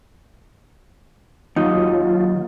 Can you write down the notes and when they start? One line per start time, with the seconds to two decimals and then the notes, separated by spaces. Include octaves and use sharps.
1.56 D#2 F#3 D#4 F4